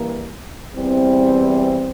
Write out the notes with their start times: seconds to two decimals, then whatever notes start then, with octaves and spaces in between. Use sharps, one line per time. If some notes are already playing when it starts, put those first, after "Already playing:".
Already playing: G2 E3 A#3
0.73 E2 E3 G3 C4
1.58 C5